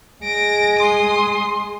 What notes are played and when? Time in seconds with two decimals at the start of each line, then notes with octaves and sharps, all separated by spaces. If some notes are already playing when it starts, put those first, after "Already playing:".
0.24 G#3 A#6 D7
0.80 C6 D#6